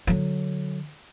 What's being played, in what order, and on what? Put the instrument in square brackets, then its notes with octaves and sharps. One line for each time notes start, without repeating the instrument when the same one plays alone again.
[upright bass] D3 F#3